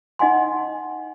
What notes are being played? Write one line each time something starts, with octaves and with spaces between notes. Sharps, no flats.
D#4 D#5 F#5 G#5 C6